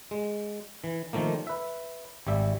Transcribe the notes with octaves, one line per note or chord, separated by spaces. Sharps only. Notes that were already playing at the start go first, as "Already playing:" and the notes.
G#3
E3
D#3 F3 A3 A#3
B4 E5
G#1 G3 E5